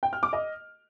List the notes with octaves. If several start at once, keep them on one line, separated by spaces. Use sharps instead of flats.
G5
F6
D6
D#5